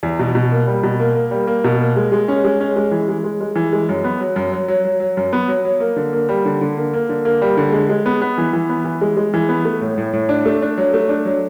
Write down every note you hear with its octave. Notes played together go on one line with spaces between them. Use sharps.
E2
B2
B2
A#3
G3
B2
A#3
A#3
G3
A#3
B2
A#3
G#3
G#3
C#4
G#3
C#4
G#3
E3
G#3
G#3
G#3
E3
G#3
F#2
B3
F#3
F#2
F#3
F#3
F#3
F#3
F#2
B3
F#3
F#3
A#3
D3
A#3
G3
D3
D3
A#3
A#3
D3
A#3
G3
D3
G#3
G#3
B3
B3
E3
E3
B3
E3
G#3
G#3
E3
B3
A3
A2
A2
A2
D4
A3
D4
F#3
A3
D4
F#3